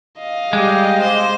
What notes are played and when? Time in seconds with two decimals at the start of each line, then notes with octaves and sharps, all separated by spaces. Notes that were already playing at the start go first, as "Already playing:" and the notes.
0.19 D#5 F5
0.53 G3 G#3 G4
1.02 C5